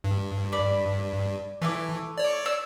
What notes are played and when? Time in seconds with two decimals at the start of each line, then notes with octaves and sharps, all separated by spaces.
0.04 G2
0.52 D5 B5
1.62 E3 A3 E4 D6
2.18 C#5 D5
2.46 E6